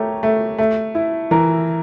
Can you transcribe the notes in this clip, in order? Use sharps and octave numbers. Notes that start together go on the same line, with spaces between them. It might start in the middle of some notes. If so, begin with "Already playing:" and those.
Already playing: A3 G4 A#4 C#5
A3
A3
E4
E3 A#4